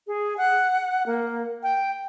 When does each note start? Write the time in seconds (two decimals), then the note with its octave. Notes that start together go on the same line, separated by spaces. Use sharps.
0.07 G#4
0.38 F#5
1.06 A#3
1.63 G5